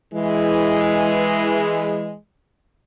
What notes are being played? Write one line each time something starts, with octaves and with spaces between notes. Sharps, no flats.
E3 G#3